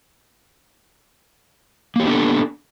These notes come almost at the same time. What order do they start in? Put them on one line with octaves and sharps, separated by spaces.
A#3 G4 B3 D4 A4